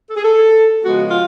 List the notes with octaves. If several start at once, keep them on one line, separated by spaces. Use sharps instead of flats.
A4
G#4
A4
C#3 F3 G#3 B3 F#4
F4